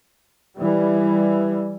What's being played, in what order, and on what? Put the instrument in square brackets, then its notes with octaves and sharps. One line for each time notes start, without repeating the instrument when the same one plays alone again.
[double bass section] E3 G3